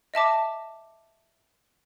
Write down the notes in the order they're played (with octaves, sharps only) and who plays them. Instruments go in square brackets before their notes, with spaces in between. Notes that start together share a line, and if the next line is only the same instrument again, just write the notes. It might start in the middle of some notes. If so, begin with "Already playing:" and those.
[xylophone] D#5 E5 A5 D6